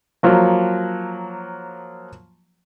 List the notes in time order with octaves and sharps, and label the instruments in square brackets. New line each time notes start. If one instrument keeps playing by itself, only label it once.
[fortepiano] F3 F#3 A#3